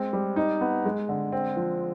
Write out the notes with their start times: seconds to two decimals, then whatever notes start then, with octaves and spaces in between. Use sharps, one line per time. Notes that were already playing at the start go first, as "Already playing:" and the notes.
Already playing: G#3 C4
0.13 G3
0.36 D#4
0.61 B3
0.85 G#3
1.09 D3
1.32 C4
1.56 F3